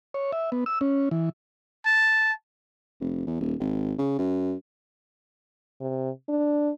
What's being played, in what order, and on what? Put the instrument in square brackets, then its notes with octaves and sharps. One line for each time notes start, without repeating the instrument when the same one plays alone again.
[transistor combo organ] C#5
E5
B3
E6
C#4
E3
[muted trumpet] A5
[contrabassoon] F1
E2
D#1
G#1
C#3
F#2
[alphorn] C3
D4